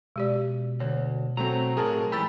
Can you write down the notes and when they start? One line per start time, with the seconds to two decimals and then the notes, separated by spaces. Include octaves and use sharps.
0.16 B2 G#3 G4 D5
0.80 D2 C#5
1.37 F#3 A3 C4 A#5
1.77 A2 C3 F#3 G#4 A#4 A5
2.12 G#2 E3 G4 B5 E6 A6